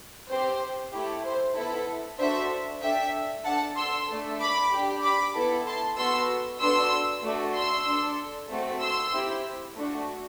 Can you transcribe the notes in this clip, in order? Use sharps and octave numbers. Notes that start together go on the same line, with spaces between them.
C4 G4 C5
A3 E4 G4
C5
B3 E4 A4
D4 F#4 A4 C5 E5
D4 A4 E5 G5
D4 A4 F#5 A5
C6 E6
A3 D4 A4
B5 D6
D4 G4
B5 D6
B3 E4 A4
A5 C6
B3 F#4 A4 C6 E6
B3 D4 F#4 A4 C6 E6
A3 D4 F#4 A4
C6 E6
D4 A4
A3 C4 F#4 A4
C6 E6
C4 E4 G4
A3 D4 F#4